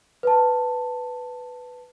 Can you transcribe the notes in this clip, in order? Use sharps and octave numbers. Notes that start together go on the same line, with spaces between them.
B4 A5